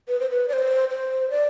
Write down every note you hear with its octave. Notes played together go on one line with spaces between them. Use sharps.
B4
C5
B4
D5
C5
C5
D5